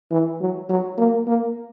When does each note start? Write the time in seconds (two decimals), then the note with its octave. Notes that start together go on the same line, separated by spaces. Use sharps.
0.11 E3
0.40 F#3
0.70 F#3
0.98 A#3
1.27 A#3